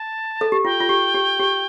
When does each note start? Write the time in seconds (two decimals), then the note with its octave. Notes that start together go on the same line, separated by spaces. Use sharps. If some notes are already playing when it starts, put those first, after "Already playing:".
Already playing: A5
0.41 A4
0.52 G4
0.65 F4 G5
0.80 F4
0.89 G4
1.14 G4
1.40 G4